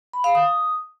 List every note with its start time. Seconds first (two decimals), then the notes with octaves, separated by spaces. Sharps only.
0.13 B5
0.24 F5
0.35 D#6